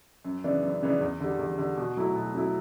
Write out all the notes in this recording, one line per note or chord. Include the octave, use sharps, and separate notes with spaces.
F#2
C#3 E3 B3 D4
F#2
C#3 E3 B3 D4
E2
D3 G3
E2
D3 G3
B2
F#3 A3 E4
B2
F#3 A3 E4